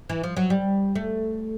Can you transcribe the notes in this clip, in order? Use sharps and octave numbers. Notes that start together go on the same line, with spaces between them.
E3
F3
F#3
G3
A3